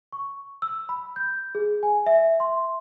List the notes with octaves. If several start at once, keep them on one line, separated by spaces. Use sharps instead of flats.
C#6
E6
B5
G6
G#4
G#5
E5
C6